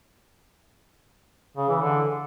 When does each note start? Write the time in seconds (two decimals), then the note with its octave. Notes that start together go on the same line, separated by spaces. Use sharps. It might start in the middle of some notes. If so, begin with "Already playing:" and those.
1.57 C#3
1.69 E3
1.81 D3